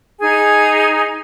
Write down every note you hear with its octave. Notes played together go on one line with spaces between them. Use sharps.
D#4 G#4 G#5